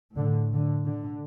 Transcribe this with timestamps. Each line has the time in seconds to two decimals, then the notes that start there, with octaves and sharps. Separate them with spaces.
0.17 A2 D3
0.53 D3
0.87 D3